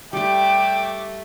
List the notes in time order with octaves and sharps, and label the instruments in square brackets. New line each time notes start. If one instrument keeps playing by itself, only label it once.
[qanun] G3 G4 [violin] A3 [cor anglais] G5 [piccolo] D6